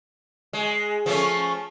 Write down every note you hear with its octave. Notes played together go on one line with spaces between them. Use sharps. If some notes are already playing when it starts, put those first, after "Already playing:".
G#3
F3 A3 C#4